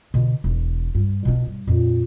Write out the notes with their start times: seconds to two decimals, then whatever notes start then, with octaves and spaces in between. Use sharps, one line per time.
0.14 B2 D3
0.44 E1
0.95 G2
1.25 B2 D4
1.47 G2
1.67 F2 A#2